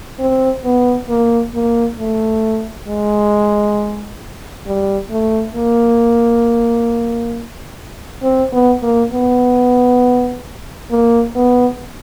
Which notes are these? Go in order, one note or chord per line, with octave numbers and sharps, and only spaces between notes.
C4
B3
A#3
A#3
A3
G#3
G3
A3
A#3
C4
B3
A#3
B3
A#3
B3